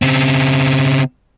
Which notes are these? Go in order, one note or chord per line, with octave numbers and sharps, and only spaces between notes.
C#3 C4